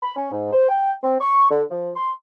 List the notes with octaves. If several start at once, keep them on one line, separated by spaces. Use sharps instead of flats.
B5
C#4
G#2
C5
G5
C4
C#6
D3
F3
C6